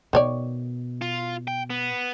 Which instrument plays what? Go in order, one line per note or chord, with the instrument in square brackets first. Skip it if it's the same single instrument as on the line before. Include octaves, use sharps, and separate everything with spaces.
[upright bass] B2 [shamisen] D#3 C#5 D5
[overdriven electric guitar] F4
G5
B3